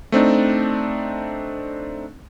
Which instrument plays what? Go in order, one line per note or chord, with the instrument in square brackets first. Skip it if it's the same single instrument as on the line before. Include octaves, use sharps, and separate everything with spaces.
[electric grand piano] A3 C4 D4 D#4